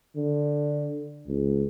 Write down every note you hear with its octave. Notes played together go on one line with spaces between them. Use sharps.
D3
C#2